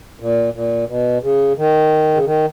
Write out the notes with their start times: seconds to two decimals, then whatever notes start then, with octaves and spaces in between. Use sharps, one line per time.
0.20 A#2
0.54 A#2
0.87 B2
1.22 C#3
1.57 D#3
2.14 C#3
2.25 D#3